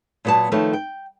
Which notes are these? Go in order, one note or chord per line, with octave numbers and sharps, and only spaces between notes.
A#2 F#3 B3 F#4 A5
D#3 F3 A3 B4 C#5
G5